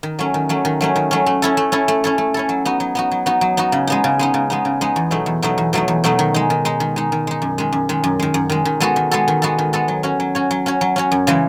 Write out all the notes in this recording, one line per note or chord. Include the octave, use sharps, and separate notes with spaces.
D#3
F#3 A3 C#4
D#3
F#3 A3 C#4
D#3
F#3 A3 C#4
D#3
F#3 A3 C#4
A3
C#4 E4 A4
A3
C#4 E4 A4
A3
C#4 E4 A4
A3
C#4 E4 A4
F#3
B3 D#4 F#4
F#3
B3 D#4 F#4
F#3
B3 D#4 F#4
F#3
B3 D#4 F#4
C#3
G#3 B3 D#4
C#3
G#3 B3 D#4
C#3
G#3 B3 D#4
C#3
G#3 B3 D#4
E2
B2 F#3 A3 D#4
E2
B2 F#3 A3 D#4
E2
B2 F#3 A3 D#4
E2
B2 F#3 A3 D#4
D#3
G#3 D#4
D#3
G#3 D#4
D#3
G#3 D#4
D#3
G#3 D#4
F#2
D#3 G#3
F#2
D#3 G#3
F#2
D#3 G#3
F#2
D#3 G#3
D#3
G#3 B3 F#4 A4
D#3
G#3 B3 F#4 A4
D#3
G#3 B3 F#4 A4
D#3
G#3 B3 F#4 A4
F#3
C#4 F#4 C#5
F#3
C#4 F#4 C#5
F#3
C#4 F#4 C#5
F#3
C#4 F#4 C#5
F#2
C#3 E3 G#3